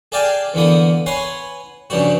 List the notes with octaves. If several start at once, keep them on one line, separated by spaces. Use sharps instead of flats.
G#4 A4 D5 F5 G5 G#5
E2 D3 A#3 B3 D#6
B4 C#5 F#5 G#5 C6
G2 C#3 F3 G3 F#4